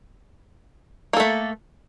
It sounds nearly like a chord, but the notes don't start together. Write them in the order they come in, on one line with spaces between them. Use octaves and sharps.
A#3 A4 A3